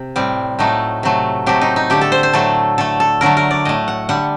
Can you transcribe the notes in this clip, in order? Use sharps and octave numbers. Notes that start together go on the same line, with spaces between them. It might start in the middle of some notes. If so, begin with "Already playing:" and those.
Already playing: C3
A2 G3 C4
A2 F#3 A3 D#4
C3 F#3 A3
C3 F#3 A3 G4
D#4
D#4
D3 A3 G4
A4
C5
C5
A2 F#3 A3 A4
D3 A3 A4
A4
D3 F#3 A3 A#4
A#4
D5
A2 A3 D#5
F#5
D3 G3 F#5